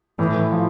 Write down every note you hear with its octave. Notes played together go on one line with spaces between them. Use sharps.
A2 E3
F3